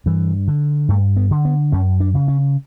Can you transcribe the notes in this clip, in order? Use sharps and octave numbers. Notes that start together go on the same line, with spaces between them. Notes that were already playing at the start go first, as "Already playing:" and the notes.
G2 E3
D3
G2 A3
B3
D3
B3
F#2 C#4
D4
C#3
C#4